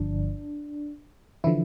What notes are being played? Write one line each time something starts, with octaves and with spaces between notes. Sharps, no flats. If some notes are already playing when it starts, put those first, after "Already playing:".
Already playing: G1 G2 D3 F3 D4
D3 E3 F3 E4